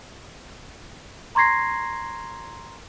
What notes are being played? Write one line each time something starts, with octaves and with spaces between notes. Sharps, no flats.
A#5 C6 C#6 G#6 A#6 C7